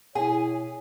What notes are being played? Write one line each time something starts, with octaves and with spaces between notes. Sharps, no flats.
B2 E4 G#4 C#5 G#5